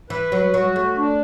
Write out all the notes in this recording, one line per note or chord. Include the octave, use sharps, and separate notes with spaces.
E3 B4
F#3
F#3 F#4
A3
D4